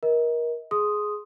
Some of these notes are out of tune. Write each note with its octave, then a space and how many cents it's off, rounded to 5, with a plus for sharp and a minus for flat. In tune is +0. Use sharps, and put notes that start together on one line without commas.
A#4 +25 D#5 +40
G#4 +10 C6 +0 D#6 +0